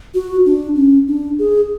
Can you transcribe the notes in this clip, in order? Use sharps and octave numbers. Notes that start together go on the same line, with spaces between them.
F#4
D4
C#4
D4
G#4